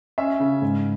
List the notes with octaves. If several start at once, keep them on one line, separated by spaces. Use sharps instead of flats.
C#4 E5
C#3
G#2